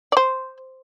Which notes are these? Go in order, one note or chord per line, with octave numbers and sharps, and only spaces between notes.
C5 D5